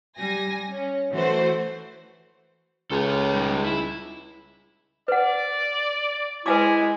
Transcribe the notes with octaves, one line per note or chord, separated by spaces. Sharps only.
G3 G#5 A#6
C#4
E3 A3 F#4 C5
C#2 A4 C#5
G3 D#4
E4
B4 D5 F#5
G#3 E4 B4 G#5 D6